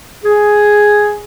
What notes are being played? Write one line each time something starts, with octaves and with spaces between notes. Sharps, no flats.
G#4